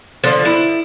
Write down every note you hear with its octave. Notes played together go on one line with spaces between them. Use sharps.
D3 F3
E4